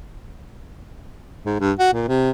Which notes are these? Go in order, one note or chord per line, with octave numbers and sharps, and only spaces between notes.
G#2
G2
F#4
A#2
C3